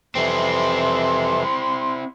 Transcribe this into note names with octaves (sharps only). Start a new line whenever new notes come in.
F2 C3 E3 C4 E4 C6